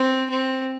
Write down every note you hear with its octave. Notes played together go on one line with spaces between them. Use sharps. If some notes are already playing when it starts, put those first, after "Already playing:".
Already playing: C4
C4